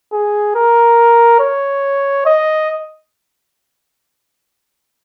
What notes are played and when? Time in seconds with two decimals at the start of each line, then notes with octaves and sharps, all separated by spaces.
0.13 G#4
0.55 A#4
1.40 C#5
2.26 D#5